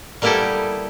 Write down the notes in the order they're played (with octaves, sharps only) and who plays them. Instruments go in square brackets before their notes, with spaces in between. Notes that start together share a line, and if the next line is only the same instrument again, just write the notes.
[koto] G3 A#3 B3 E4 G4 A4